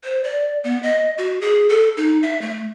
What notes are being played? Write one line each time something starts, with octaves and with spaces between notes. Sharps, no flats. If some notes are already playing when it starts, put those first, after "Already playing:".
C5
D5
B3
D#5
F#4
G#4
A4
D#4
E5
A3